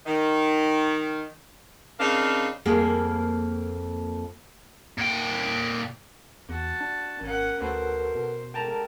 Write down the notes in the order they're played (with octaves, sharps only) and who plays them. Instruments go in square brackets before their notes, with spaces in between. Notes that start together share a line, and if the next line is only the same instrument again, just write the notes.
[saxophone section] D#3
C#3 C4 D4 D#4 A#4 F5
[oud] F2 A#3 G#4
[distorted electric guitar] A#2 G5
[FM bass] E2 [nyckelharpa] F#4 A5
[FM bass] D4
[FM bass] G#1 [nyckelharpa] C#4 F#5 [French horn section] A#4
[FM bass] D2 [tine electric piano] F#4 A4 B4 [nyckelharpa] C5
[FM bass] B2
[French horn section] D3 G#3 A#4 [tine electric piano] G5 A5 A#5